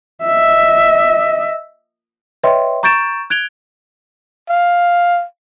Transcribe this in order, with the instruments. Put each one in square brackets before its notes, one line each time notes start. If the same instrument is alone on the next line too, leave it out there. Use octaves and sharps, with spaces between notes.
[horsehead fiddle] D#5 E5
[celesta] B4 C#5 D#5 E5 G5 C6
A#5 C#6 G6 A6 D7 E7
F#6 G#6 D7 F7 G7
[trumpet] F5